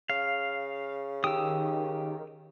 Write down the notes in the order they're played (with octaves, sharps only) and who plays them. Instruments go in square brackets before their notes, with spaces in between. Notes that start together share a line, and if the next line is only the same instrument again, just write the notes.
[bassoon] C#3 [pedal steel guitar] F5
[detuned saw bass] D#3 [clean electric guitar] G4 [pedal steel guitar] D#6 E6